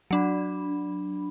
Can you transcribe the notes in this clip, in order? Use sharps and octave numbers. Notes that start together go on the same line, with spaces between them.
F#3 D4 B5